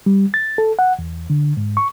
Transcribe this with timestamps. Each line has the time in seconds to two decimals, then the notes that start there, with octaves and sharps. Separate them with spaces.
0.06 G3
0.34 A6
0.58 A4
0.79 F#5
0.99 E2
1.30 D3
1.57 G#2
1.77 C#6